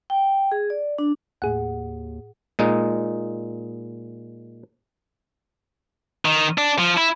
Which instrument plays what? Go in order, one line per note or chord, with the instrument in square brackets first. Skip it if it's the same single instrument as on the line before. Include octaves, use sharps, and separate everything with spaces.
[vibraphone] G5
G#4
D5
D4
[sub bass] D#2 [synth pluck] A2 G#4 F#5
[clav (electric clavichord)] A#2 G#3 D#4
[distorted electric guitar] D#3
D4
F3
E4